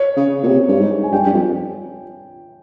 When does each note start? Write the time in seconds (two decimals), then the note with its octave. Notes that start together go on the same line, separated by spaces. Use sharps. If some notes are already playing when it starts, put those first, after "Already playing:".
Already playing: C#5
0.16 C#3
0.43 A#2
0.48 C3
0.68 G2
0.80 G#2
1.03 G#5
1.12 G2 G5
1.26 G2
1.33 F2